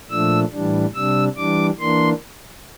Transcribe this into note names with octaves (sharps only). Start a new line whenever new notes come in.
A#2 F3 A3 D4 E6
A2 E3 G3 D4
C3 G3 D4 E6
E3 G3 D4 D6
E3 A#3 D4 C6